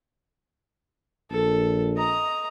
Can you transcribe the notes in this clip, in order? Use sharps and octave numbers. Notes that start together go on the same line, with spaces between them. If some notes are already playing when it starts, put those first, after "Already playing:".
A#1 A4
D#5 A#5